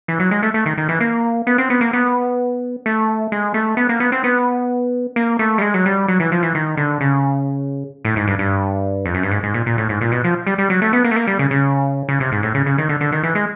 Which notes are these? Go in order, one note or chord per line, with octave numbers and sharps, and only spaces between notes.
E3
F#3
G#3
A3
A3
D#3
D#3
E3
A#3
B3
C4
B3
A#3
B3
A3
G#3
A3
B3
A#3
B3
C4
B3
A#3
A3
G3
G#3
F#3
G3
F#3
E3
F3
E3
D#3
D3
C#3
A2
G#2
G2
G2
F2
F#2
G2
G#2
G#2
A#2
A#2
A2
G#2
A#2
B2
F3
G3
G3
F#3
A3
B3
A#3
A3
A#3
G3
C#3
C#3
C#3
C3
G#2
A2
C#3
C#3
D#3
D3
D3
D#3
E3
G#3